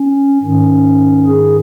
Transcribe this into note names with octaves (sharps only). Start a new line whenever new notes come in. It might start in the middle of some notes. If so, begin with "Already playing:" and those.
Already playing: C#4
G#2 D#3 C#4
G#4